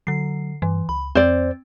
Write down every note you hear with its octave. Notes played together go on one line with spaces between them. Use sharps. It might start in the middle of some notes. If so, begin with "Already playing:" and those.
D3 F#3 C7
G2 E3
C#2 B5
F2 C4 C5 D5